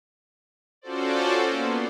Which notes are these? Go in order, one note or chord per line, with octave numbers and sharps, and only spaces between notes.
C#4 F4 F#4 A4 C5 D5
A#3 B3